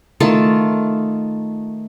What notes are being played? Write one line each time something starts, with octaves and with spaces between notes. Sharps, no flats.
D#3 A3 F4 A5